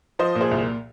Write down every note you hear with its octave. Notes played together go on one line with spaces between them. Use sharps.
F3 C5 D#5
A#2
G#4 C5
C2